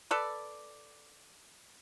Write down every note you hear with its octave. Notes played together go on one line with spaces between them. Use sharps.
A4 B4 D5